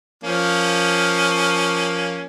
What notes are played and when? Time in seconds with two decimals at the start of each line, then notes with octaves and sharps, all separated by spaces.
0.24 F3 A#3 C#4